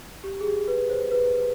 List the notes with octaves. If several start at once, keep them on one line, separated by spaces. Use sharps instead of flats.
G4
G#4
G4
B4
C5
B4